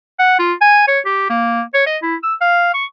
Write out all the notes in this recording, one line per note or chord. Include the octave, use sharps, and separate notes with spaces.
F#5
F4
G#5
C#5
G4
A#3
C#5
D#5
E4
E6
F5
C#6